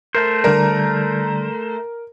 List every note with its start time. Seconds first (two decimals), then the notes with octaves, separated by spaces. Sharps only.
0.15 A3 A#4 C5
0.44 D3 G3 A#4 D5 A#5